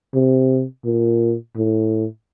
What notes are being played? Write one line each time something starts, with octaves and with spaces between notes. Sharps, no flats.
C3
A#2
A2